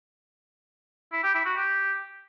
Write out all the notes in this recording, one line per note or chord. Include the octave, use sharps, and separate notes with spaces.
E4
G4
E4
F#4
G4